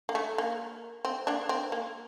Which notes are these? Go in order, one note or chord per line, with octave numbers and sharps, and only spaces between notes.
A#3
A3
A#3
C4
A#3 D4
C4
A#3